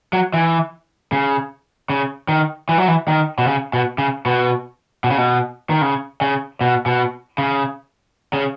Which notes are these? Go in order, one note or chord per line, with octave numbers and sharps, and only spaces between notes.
F#3
E3
C#3
C#3
D#3
E3
F#3
E3
D#3
B2
C#3
B2
C#3
B2
B2
C#3
B2
D#3
C#3
C#3
B2
B2
C#3
C#3